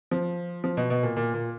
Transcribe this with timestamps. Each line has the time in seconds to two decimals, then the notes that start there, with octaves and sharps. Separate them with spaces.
0.11 F3
0.64 F3
0.77 B2
0.90 B2
1.03 A#2
1.17 A#2
1.34 A#2